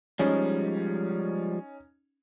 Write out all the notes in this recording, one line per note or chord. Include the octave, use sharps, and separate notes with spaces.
F3 G3 G#3 C#4 D#4